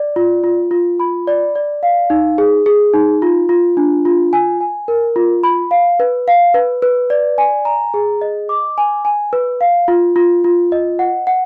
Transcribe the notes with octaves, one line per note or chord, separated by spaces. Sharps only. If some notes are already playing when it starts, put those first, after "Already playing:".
Already playing: D5
F4
F4
F4
B5
D5
D5
F5
D#4
G#4
G#4
D#4
F4
F4
D4
F4
G#5
G#5
A#4
F4
B5
F5
B4
F5
B4
B4
D5
G#5
A#5
G#4
D#5
D6
G#5
G#5
B4
F5
F4
F4
F4
D#5
F#5
F#5